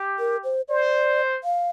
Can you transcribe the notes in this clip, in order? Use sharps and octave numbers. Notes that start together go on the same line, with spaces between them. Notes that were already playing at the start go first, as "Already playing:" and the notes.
Already playing: G4
A#4
C5
C5 D5
F5